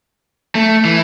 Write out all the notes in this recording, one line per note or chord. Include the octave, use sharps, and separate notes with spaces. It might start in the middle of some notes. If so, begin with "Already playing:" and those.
A3
E3